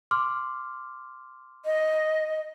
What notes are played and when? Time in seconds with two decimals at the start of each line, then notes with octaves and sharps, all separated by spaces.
0.11 C6 D6 F6
1.65 D#5